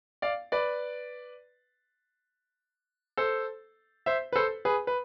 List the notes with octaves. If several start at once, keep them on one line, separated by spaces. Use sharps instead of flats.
D5 F5
B4 D5
A4 C5
C5 E5
B4
A4 C5
G#4 B4
B4